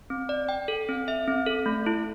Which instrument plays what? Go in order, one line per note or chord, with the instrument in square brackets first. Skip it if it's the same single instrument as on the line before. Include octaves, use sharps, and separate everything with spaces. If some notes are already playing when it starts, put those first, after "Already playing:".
[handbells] C4
D5
G5
A4
C4
E5
C4
A4
A3
E4